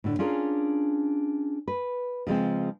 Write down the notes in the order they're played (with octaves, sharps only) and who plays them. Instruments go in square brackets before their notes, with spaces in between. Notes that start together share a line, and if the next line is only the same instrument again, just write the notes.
[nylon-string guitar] A2 D3
C#4 D4 F4 G#4 A#4
B4
C#3 F3 G#3 C4